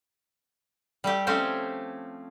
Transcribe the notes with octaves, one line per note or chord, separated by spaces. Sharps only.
G3 A3 G4
F3 A3 C4 C#4 G4 C5